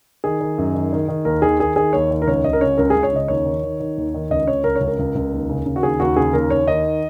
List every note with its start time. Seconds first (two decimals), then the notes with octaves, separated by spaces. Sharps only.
0.24 D#3 G#4
0.40 D#3
0.58 F#2
0.74 D#3
0.92 D#3
1.08 D#3
1.25 D#2 A#4
1.42 D#3 G#4
1.59 D#3 G#4
1.76 D#3 G#4
1.93 D#2 C#5
2.10 D#3
2.22 A#4
2.28 C#2 C#5
2.44 C#2 D#5
2.53 A#4
2.61 C#3 C#5
2.78 C#2 A#4
2.90 C#2 G#4
3.03 C#5
3.13 C#3 D#5
3.28 D#2 C#5
3.45 D#3
3.63 D#3
3.80 D#3
3.97 D#2
4.14 D#3
4.30 C#2 D#5
4.47 C#3 C#5
4.64 C#2 A#4
4.76 C#5
4.81 C#2
4.88 A#4
4.99 C#2
5.15 C#2
5.33 D#2
5.49 C#3
5.66 C#3
5.76 F#4
5.83 D#2 G#4
6.00 D#2 F#4
6.16 C#3 G#4
6.33 D#2 A#4
6.50 D#2 C#5
6.67 D#3 D#5